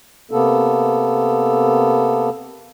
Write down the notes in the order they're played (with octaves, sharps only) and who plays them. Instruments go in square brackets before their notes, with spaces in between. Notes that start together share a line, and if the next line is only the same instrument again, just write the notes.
[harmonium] C3 A#3 B3 A4